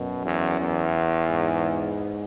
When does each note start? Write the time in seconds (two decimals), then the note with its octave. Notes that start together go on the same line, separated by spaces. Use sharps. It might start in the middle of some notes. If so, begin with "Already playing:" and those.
Already playing: F#2 B2
0.25 E2
0.60 E2
1.28 G#2